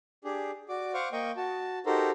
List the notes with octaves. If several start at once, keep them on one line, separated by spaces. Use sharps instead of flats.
D4 G4 G#4
F#4 D5 D6
C5 F5 F#5 C#6 D6
A#3 D#5 G5 C#6
F#4 A5
D#4 F#4 G4 A4 A#4 C5